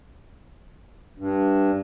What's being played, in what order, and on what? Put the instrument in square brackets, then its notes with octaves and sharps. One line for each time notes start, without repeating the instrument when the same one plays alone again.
[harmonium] G2